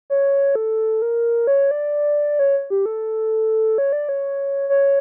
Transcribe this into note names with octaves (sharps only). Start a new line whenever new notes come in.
C#5
A4
A#4
C#5
D5
C#5
G4
A4
C#5
D5
C#5
C#5